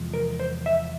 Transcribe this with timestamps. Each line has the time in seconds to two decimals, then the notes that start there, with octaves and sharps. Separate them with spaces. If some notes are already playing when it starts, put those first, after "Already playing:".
Already playing: E2 C3 F3 G#3
0.14 A#4
0.40 C5
0.66 E5